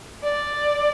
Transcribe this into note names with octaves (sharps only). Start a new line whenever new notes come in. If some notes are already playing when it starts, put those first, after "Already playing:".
D5